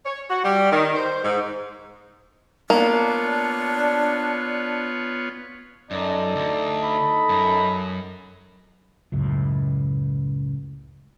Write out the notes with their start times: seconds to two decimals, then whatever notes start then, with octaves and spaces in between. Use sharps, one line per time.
0.06 C#5
0.30 F#4
0.44 G3
0.71 D#3
0.95 C5
1.24 G#2
2.70 A#3 B3 D4 F4 C#5
5.91 F#2 D#4 A4 D5 D#5
6.36 D2
6.84 B5
7.29 F#2
9.12 C#2 F#2 A2